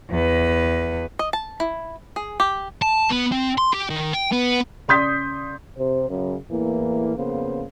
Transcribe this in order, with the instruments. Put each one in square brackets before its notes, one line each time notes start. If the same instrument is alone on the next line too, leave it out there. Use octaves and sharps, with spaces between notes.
[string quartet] E2 B4
[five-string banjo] D#5
A5
E4
G#4
G4
[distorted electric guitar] A5
B3
C4
C6
G4
D#3
G5
B3
[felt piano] C#3 D5 C6 D#6 G6 B6
[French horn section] C3 C5
F#2 C#3
E2 A2 E3 A#3
F2 C#3 A#3 B3 C5